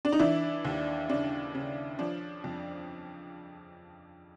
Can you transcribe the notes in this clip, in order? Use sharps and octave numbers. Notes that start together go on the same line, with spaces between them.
D4
D#4
E3 D4 E4
D#2
C#3 D4
C#3
F3 D4
F2